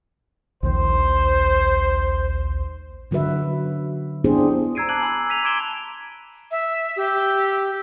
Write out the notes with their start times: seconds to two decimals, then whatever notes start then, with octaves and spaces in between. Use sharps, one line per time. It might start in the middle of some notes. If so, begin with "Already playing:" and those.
0.63 A#1 D#2 D#3 C5
3.11 D3 F#3 F#4 B4 E5
4.24 B3 D4 E4 G4 G#4 C5
4.75 A#5 E6 G#6 C7 D7 D#7
4.89 A5 D6 F#6 F#7
5.01 G#5 A#5 B5 E6 F#7
5.30 B6 D#7 F7 F#7
5.44 C6 D6 G#6 D7 E7 G7
6.51 E5
6.97 G4 E6